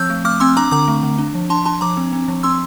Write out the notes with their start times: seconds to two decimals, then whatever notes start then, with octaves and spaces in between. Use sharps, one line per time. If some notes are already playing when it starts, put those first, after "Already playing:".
Already playing: F3 C4 E6 G6
0.10 A3
0.25 A3 D6 F6
0.40 C4 C6 E6
0.57 D4 A#5 D6
0.71 D3 A#5 D6
0.88 A3
1.03 D3
1.18 D4
1.35 F3
1.50 D4 A5 C6
1.65 D4 A5 C6
1.81 F3 A#5 D6
1.97 C4
2.13 C4
2.28 F3
2.43 C4 C6 E6